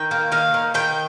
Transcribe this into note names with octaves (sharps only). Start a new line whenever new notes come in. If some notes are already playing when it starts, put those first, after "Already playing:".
Already playing: D#3 G5
A#3
D#3 F5
D#3
D#3 G5